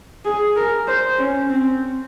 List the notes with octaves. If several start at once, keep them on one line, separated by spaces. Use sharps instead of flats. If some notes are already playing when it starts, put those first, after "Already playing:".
G#4
A#4
C5
C#4
C4